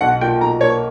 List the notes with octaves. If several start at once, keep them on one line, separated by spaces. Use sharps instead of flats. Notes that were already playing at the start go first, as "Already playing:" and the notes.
B1 F#5
A#2 G5
B1 A#5
A#3 C#5